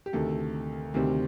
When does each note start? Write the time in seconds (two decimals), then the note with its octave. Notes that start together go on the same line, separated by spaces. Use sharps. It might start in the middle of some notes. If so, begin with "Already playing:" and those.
0.06 G4
0.13 D2 C3 D#3 A4
0.94 D2 C3 D#3 G3 C4